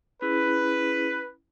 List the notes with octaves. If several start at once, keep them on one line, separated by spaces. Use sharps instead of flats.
C#4 E4 G#4 B4